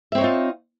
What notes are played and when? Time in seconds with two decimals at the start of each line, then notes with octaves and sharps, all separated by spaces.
0.12 E5
0.15 C4
0.18 C#5
0.21 D#4
0.24 F4